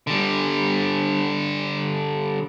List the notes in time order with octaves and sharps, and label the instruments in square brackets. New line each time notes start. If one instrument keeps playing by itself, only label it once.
[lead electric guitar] D3 G3